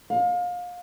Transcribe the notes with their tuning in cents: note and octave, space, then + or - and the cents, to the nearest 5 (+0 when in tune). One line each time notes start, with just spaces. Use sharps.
F5 +30